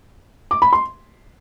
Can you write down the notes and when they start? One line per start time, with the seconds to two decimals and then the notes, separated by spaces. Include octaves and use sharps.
0.51 D6
0.62 B5
0.73 C6